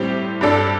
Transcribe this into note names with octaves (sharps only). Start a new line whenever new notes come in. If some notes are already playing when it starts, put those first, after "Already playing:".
Already playing: A2 G3 C4 G4
G2 G3 D4 A4